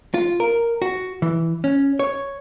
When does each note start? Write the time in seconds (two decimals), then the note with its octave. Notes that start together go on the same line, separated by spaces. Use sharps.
0.14 F4
0.40 A#4
0.82 F#4
1.22 E3
1.64 C#4
1.99 C#5